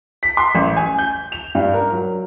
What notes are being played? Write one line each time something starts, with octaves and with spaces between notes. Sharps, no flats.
B6
C6
A1
G#5
G6
F7
G2
A#4
F#3